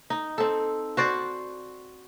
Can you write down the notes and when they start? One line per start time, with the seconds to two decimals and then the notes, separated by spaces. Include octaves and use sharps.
0.10 D#4
0.38 C4 A4
0.97 F#4 C5 D5